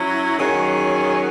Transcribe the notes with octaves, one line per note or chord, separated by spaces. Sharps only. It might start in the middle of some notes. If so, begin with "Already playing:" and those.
Already playing: F#3 C#4 E4
D#3 F#3 C#4 G#4